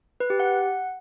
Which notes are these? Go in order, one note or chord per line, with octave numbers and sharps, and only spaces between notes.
B4
G4
F#5